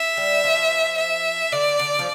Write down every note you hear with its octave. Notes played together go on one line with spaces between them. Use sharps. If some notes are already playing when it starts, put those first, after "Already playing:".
Already playing: E5
G3
F3
E5
D3 D5
D3
F3